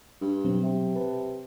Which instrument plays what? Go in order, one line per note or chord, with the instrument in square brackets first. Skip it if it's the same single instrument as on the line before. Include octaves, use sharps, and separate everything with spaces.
[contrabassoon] G2
[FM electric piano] B2 F#3 C4
[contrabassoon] C3
[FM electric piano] B4 A5